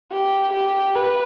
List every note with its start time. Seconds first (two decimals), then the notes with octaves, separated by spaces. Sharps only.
0.11 G4
0.53 G4
0.95 B4